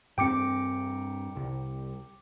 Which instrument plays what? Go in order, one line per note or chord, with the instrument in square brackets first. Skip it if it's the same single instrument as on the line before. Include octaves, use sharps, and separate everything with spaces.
[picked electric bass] G2 C4 [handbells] G5 D6 C#7
[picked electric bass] C2